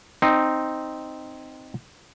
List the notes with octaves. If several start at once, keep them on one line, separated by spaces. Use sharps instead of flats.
C4 D#4